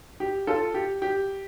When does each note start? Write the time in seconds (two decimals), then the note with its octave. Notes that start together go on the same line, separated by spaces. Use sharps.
0.20 G4
0.47 F4 A4
0.74 G4
1.02 G4